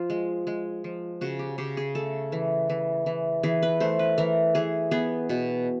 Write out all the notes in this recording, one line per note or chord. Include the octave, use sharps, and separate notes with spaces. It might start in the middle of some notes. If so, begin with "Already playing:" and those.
Already playing: F3 F4
G#3
G#3
F3
C#3 F#4
G4
C#3 G4
G#4
A3 A4
E3
E3
E3
E3 G#4
B4
A3 C5
B4
E3 A#4
E3 G#4
B3 G#4
B2